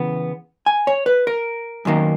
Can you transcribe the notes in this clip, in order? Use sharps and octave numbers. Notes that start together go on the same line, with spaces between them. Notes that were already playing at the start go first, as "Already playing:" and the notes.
Already playing: C#3 E3 B3
G#5
C#5
B4
A#4
F#2 D#3 A#3